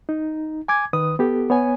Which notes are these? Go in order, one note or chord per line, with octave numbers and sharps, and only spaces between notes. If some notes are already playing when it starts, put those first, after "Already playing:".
D#4
G#5 D6 G#6
D#3 B4 D#6
B3 G4 A4
B3 C#5 G#5